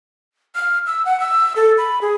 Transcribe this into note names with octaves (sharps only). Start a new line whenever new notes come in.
F6
E6
F#5
E6
A4
B5
G#4